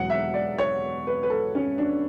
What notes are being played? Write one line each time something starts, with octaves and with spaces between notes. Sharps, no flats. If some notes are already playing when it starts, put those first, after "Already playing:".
Already playing: E1 E2 B2 F#3 F#5
E5
D5
C#5
B4
B4
A4
C#4
D4